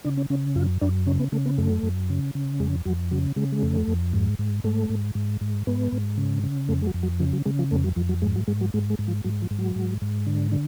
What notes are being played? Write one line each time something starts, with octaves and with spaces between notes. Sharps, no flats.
C#3 D4
C#4
C#3 C#4
F#2 F4
F#2 D4
C#3 C#4
B3
C#3 A3
B3
F#2 A3
F#2
C#3
C#3
F2 G#3
F2 F#3
C#3 F#3
C#3 G#3
G#3
F2 A3
F2
G#2
G#2
G#2 A3
G#2
G#2
G#2
G#2 B3
G#2
C#3
C#3
F2 A3
G#3
F#3
F2
F#3
C#3 F3
F#3
C#3 G#3
F3
F2 A3
F#3
F2 F3
F#3
G#2 G#3
F#3
G#2 G#3
F#3
G#2 G#3
G#3
G#2
F3
G#2 F#3
F3
G#2
F#3
G#2
G#2
D3
D3